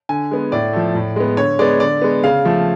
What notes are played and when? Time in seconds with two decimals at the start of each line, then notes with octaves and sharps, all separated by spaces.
0.09 D3 G#5
0.31 G#3 B3
0.52 A2 D5
0.73 F3 A3
0.95 A2
1.16 G#3 B3
1.37 D3 C#5
1.59 G#3 B3 D5
1.80 D3 D5
2.02 G#3 B3
2.24 C#3 F5
2.45 F3 A3